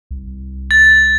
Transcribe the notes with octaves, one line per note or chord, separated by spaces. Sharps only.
C2
A6